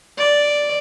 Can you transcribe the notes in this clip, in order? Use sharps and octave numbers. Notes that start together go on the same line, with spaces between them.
D5